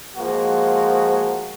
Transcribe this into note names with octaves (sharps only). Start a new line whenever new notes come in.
F3 G#3 A#3 F#4